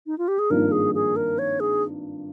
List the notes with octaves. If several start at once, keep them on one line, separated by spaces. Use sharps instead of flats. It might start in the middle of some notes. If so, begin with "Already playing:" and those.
D#4
F4
G4
G#4
G#1 G2 F3 A#3 D#4 A#4
G#4
G#4
A#4
C#5
G#4